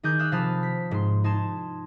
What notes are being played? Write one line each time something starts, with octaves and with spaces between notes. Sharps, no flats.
D#3 D#4 G#4 D6 G6 G#6
F5 D#6 E6 F#6
C3 F3 F5 A5 B5 D#6
B6
G#2 C6
D#4 A5 C6 G#6 E7